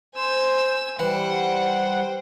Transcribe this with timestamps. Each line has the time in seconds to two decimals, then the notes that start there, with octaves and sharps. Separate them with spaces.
0.16 C5 G#5 E6
0.99 E3 G3 C5 F#5 G5